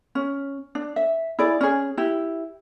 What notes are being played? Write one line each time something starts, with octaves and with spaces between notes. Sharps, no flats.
C#4
D4
E5
E4 G#4 D5
C#4 G#4
E4 G4